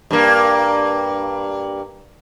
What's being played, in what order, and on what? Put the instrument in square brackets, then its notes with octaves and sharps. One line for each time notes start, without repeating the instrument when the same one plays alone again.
[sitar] G2 A#3